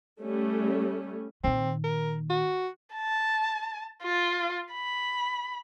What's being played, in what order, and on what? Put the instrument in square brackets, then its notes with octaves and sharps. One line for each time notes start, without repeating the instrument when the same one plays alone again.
[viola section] G3 A3 C#4
[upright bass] A#2 D#3 [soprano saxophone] C4
[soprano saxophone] A#4
F#4
[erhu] A5
F4
B5